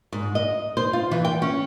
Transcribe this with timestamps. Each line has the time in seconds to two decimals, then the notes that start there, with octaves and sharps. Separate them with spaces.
0.12 G#2
0.35 D#5
0.77 C5
0.93 F4
1.11 E3
1.25 G5
1.42 C#4